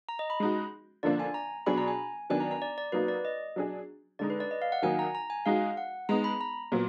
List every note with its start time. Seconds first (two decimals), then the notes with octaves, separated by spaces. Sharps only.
0.09 A#5
0.19 D#5
0.30 B5
0.40 G#3 D#4 F#4
1.03 D3 F3 A#3 D4 D5
1.20 G#5
1.34 A#5
1.66 B2 F#3 D4 G#4 B5
1.78 A#5
1.88 G#5
2.30 D#3 F#3 B3 D4 G#5
2.40 A#5
2.51 A#5
2.62 D5
2.78 D5
2.92 F#3 A#3 D#4 F#4 B4
3.08 D5
3.25 D#5
3.56 F#3 D4 G#4
4.19 D3 G#3 D#4 D5
4.30 B4
4.40 D5
4.51 D#5
4.62 F5
4.72 F#5
4.82 D#3 F#3 A#3 D#4 G#5
4.99 A#5
5.15 A#5
5.30 G#5
5.46 G#3 D#4 F#4 F5
5.77 F#5
6.09 G#3 B3 D#4 A#5
6.24 B5
6.41 A#5
6.72 A#2 F#3 B3